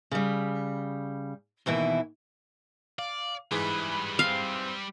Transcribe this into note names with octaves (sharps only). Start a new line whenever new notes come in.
C#3 G3
D#2 B2 E3 E4
D5 F5
G#2 E3 G3 E4 G#4 B4 B5
C4 F5